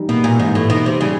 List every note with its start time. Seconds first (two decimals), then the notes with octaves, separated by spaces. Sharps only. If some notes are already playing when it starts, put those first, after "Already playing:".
Already playing: E3 G3 D#4
0.08 B2 A#3
0.24 A#2
0.40 G#2 E3
0.55 A2
0.70 B2 D#4
0.86 C3
1.01 C#3 G3